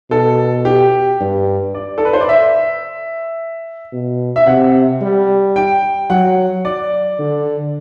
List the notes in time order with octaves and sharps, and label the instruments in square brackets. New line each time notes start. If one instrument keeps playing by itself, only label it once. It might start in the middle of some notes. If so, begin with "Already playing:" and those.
[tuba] B2 [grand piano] A4
[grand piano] G4
[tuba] G2
[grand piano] D5
A4
B4
C5
D5
E5
[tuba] B2
[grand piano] E5
[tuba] C3 [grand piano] F#5
[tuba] G3
[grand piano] G5
[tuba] F#3 [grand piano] F#5
[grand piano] D5
[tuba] D3